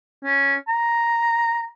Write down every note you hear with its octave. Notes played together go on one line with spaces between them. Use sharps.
C#4
A#5